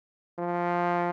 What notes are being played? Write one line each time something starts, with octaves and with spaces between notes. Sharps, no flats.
F3